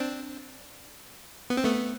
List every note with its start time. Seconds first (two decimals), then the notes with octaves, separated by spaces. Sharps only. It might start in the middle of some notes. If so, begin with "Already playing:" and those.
Already playing: C4 D4
1.50 B3
1.57 C4
1.64 A3 B3